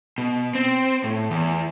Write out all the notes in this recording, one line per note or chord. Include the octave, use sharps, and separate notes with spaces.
B2
C4
A2
E2